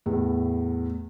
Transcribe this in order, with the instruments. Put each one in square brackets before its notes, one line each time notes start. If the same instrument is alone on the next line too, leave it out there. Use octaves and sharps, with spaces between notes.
[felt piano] E2 A2